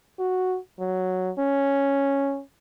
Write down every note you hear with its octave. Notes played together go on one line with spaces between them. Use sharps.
F#4
F#3
C#4